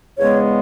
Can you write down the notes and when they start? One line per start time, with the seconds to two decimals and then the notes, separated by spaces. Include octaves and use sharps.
0.18 E2 C#3 G#3 B3 C#5